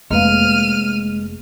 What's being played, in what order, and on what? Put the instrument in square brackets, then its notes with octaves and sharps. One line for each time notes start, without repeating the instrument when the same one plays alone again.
[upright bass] F1 [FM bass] G#3 [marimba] A#3 B4 F5 [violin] F6 D#7